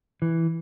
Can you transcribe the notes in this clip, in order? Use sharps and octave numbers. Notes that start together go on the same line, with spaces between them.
E3